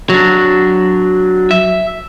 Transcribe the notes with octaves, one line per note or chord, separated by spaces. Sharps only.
F#3 D4
E5